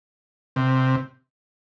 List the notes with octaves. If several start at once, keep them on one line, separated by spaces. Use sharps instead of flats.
C3